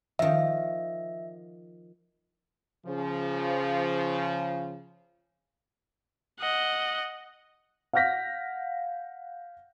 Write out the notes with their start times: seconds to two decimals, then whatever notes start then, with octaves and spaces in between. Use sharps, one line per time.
0.19 D#3 F3 E5
2.86 C#3 F3
6.40 D#5 F#5
7.93 F5 F#5 F6 G6 A#6 B6